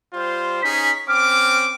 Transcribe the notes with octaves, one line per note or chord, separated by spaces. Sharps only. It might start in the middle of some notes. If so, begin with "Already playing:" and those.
G3 F4 C5
C#4 D#4 G#4 B6
C4 C#4 D6 F6